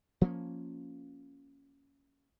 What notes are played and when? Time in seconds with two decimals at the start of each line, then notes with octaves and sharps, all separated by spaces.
0.21 F3 A#3 C#4